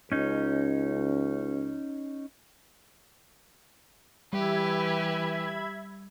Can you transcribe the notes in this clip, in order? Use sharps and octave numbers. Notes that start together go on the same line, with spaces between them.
C#2 C#4 D#4
E3 G3 G4 B4 E5 B5 G#6